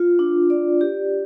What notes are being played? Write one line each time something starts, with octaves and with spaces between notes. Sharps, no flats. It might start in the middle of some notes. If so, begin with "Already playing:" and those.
Already playing: F4
D4
D5
G4